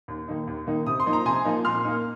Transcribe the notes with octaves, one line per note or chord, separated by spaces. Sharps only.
D#2
D#3 A#3 D#4
D#2
D#3 A#3 D#4
C3 D#6
C6
F3 A#3 D#4
A#5
C3 G#5 C6
F3 A#3 D#4
A#2 C6 F6
A#3 D#4